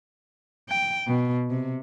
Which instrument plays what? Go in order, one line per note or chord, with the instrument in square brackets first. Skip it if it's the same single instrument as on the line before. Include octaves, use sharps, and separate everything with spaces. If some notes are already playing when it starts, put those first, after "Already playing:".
[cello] G5
B2
C3